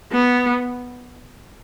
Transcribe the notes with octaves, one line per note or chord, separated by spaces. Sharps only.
B3